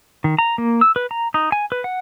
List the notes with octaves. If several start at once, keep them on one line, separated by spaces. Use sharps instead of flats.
D#3
A#5
A#3
E6
B4
A#5
D#4
G#5
B4
F#5